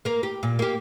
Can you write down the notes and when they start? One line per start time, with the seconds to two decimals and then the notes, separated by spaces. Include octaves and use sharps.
0.05 A#3 A#4
0.23 G4
0.43 A#2
0.59 A#3 G4